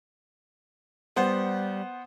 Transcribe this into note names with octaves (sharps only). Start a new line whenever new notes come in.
G3 B3 C5 F#5